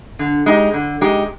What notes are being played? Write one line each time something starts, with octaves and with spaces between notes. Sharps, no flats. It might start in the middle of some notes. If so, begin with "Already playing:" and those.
D3
G#3 D#4 G4
D3
G#3 D#4 G4